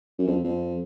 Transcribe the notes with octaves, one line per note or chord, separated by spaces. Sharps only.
F#2
F2
F2